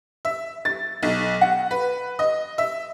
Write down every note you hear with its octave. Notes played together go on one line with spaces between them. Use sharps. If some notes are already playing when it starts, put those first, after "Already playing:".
E5
A6
B1
F#5
B4
D#5
E5